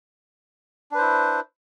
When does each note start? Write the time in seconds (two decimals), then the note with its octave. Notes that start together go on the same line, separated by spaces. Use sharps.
0.92 D4
0.95 B4
0.98 C5
1.01 E4